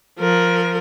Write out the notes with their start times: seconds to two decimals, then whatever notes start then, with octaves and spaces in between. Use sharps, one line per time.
0.19 F3 A#4